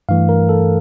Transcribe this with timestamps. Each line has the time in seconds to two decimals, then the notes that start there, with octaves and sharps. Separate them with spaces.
0.09 G2 E3 A3 F5
0.29 A#4
0.49 A4